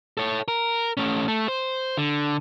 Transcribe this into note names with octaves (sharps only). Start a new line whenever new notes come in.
A4 C#5
A#4
A3 C#4
A3
C5
D3